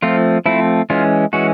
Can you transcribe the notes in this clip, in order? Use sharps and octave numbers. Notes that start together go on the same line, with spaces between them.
F3 A3 C4 F4
F3 A3 C4 E4
E3 G#3 C#4 F4
E3 G#3 C#4 F#4